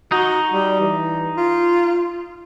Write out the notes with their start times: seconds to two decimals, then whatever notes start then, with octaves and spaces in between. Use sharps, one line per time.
0.12 D#4 F#4
0.52 G3
0.80 E3
1.37 F4